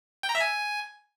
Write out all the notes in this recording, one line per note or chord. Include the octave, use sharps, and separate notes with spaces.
G5
A#5
E5
G#5